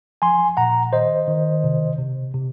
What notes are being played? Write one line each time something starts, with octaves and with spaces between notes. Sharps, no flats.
F3 G#5 C6
A#2 F#5 A#5
D#3 C5 D#5
D#3
C3
C3
C3